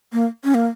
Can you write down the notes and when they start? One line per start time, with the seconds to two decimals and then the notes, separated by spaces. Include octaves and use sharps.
0.13 A#3
0.44 C#4
0.54 A#3